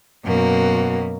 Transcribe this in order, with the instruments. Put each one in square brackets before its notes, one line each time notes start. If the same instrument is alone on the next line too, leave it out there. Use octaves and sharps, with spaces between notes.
[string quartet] F#2 B2 A#3